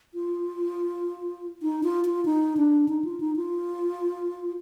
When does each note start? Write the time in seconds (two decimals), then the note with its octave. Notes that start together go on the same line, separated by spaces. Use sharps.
0.14 F4
1.63 D#4
1.83 F4
2.05 F4
2.25 D#4
2.57 D4
2.89 D#4
3.04 F4
3.20 D#4
3.36 F4